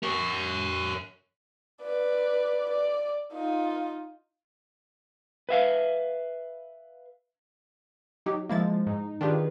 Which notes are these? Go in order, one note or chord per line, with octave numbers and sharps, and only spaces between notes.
A#4 C#5
B4 D5
D5
D#4 F4
B4 E5 F5
F#3 D#4 G4
F3 G#3 A#3 E4 A6
G#2 D#4
D#3 D4 F4 G4 G#4 B4